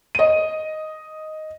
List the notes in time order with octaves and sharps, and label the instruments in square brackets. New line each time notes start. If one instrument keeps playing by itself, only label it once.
[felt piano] D#5 D#7